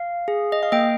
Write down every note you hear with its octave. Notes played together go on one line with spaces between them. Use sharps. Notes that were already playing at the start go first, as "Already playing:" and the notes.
Already playing: F5
G#4
D#5
F5
A#3 D#5 G5